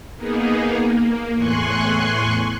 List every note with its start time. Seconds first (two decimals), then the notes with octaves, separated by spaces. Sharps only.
0.16 A#3 B3 D#4 G#4
0.81 A#3
1.34 E2 A2 G#5 C6 C#6 F#6